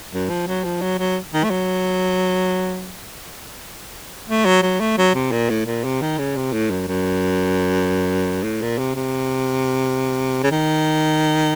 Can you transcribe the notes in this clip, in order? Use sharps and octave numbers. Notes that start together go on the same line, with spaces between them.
F#2
F3
F#3
F3
F#3
F#3
D#3
A3
F#3
A3
F#3
F#3
A3
F#3
C3
A#2
A2
A#2
C3
D#3
C#3
C3
A2
F#2
F#2
A2
A#2
C3
C3
C#3
D#3